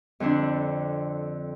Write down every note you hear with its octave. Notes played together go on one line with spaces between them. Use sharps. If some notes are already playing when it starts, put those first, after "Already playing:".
F2 D3 C4 D4